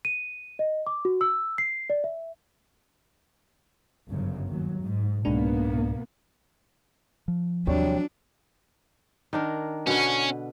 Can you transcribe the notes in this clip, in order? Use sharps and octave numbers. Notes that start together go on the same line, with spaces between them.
D#7
D#5
D6
F#4
E6
C7
D5
E5
G1 F#2 C#3
D#2 F#3
G#2
C2 G#2 B2 A#3 B3 D4
F3
D#2 C3 F#3 G3 D4 C#5
D#3 D4 A#4
B2 D3 C#4 B4